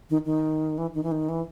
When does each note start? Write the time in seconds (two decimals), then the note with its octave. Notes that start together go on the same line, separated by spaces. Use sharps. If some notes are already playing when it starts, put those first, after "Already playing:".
0.10 D#3
0.26 D#3
0.78 E3
0.94 D#3
1.03 E3
1.12 D#3
1.29 E3